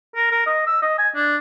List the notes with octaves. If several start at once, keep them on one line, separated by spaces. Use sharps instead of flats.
A#4
A#4
D#5
E6
D#5
G#5
D4